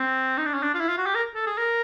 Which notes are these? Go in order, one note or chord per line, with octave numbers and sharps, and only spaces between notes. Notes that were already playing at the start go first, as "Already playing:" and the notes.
Already playing: C4
D#4
D4
C#4
D4
F4
E4
F4
F#4
G4
A#4
A4
G#4
A#4